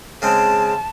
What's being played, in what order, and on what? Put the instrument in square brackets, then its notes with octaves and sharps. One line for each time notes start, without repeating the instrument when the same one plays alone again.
[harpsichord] C#3 G#3 C4 [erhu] A5